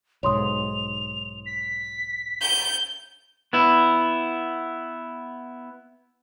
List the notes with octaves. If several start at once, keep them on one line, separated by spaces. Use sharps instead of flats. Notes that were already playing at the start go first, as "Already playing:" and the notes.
B1 G#2 C#5 C6 D#6 F7
B6
G6
B3 E4